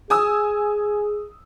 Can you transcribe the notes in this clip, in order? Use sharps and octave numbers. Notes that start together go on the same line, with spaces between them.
G#4 G#5 D#6 E6